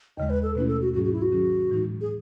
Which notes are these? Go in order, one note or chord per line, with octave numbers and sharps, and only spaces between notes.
D#2 C#3 G#3 D#5
B4
A4
B2 A3 C#4 E4 B4
A4
F#4
G#2 F#3 C#4 F#4 G#4
F#4
E4
F#4
D#3 F#3 C#4 G#4
A2 E3 G#3 D#4
G#4